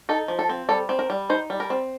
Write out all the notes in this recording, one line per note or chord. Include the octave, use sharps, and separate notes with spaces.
D#4 A4
F3
A4
C4
G3 A4
C4
A#4
G3
D#4 C5
G3
A#4
C4